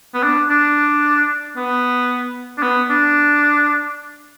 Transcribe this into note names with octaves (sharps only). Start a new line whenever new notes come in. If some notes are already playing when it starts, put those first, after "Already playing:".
B3
D4
D4
B3
D4
B3
D4